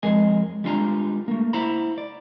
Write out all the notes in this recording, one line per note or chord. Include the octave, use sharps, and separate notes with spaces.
F2 G#3 G#4 A#4 D#5 G#5
G3 G#3 D4 F4 G#5 A#5
A3 A#3
E4 C5 F5 F#5 A#5 B5
D5